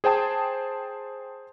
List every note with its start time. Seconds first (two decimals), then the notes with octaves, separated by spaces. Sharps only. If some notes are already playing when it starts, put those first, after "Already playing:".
0.04 G#4 C5 G5 A5 D#6